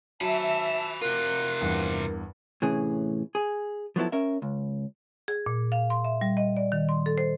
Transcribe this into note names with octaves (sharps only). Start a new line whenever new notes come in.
F#3 E5 G#5 A5 B5
C3 F4 A#4 F#6
E2 G2
A2 C3 E3 C#4 G#4
G#4
F3 F#3 B3 E4 A4
C#4 A#4 E5
C#2
G#4
A#2
F5
C6
E5
G3
D#5
D5
D#3
C6
A4
C5